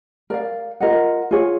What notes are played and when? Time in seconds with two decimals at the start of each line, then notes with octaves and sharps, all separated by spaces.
0.30 A#4 D5 F5
0.80 F4 A#4 D#5 F#5
1.31 F4 G#4 C#5